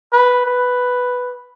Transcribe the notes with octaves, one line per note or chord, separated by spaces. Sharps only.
B4
B4